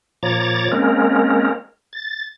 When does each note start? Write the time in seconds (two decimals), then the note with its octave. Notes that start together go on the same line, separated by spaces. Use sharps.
0.23 A#2 F3 C#5 A#5 D6 A6
0.72 G#3 A#3 C4 C#4 A#4
1.93 A6